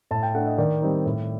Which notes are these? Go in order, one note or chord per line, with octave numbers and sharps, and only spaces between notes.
A2 A5
G5
A3 D4 F#5
D#5
D#3 D5
G3 C4 D#4
A2